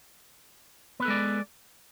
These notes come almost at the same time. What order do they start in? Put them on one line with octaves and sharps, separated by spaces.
B3 B4 A4 G#3 D5